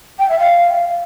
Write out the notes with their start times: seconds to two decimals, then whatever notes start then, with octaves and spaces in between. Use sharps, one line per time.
0.19 G5
0.28 E5
0.38 F5